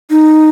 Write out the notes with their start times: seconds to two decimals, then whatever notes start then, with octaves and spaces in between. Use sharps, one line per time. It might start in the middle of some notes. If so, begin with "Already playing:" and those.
0.10 D#4